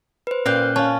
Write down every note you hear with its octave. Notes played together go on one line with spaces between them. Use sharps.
B4 C5
A#2 C#4 F5 G5 F#6 G6
C#4 F5 A5